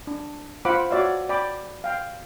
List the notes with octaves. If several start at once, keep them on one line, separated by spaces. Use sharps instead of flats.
D4
F4 C5 F5 F#5 B5 D6
F#4 C#5 D5 E5 F5
D5 G5 B5 D6
F5 G5